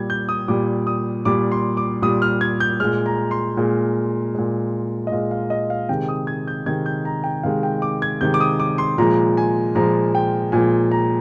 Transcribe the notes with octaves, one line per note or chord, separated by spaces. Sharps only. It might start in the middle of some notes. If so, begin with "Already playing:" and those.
Already playing: A#2 G3 G#6
G6
D#6
A#2 G3 D6
D#6
A#2 G3 D6
C6
D6
A#2 G3 D#6
F6
G#6
G6
A#2 G#3 F6
A#5
C6
A#2 G#3
A#2 G#3
D#5
A#2 G#3 F5
F5
D#5
F5
C3 D#3 G#3 G5
D#6
G#6
G6
C3 D#3 G#3 G#6
G6
A#5
G5
C3 D#3 G#3 F5
G5
D6
G#6
C3 D#3 G#3 G6
D6
D#6
D6
C6
A#2 F3 G#3 A#5
G#5
A#2 F3 G#3 A#5
G5
A#2 F3 G#3 G#5
A#5